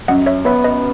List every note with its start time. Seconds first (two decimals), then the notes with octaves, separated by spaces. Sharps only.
0.08 F#2 D#5 F#5
0.26 C#5 E5
0.45 B3 C#5 E5
0.64 B4 D#5